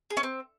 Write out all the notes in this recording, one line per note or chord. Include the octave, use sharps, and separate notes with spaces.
G#4
C#4
C4